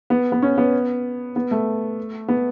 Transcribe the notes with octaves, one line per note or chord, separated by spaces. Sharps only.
B3
B3
C#4
B3
B3
A3
B3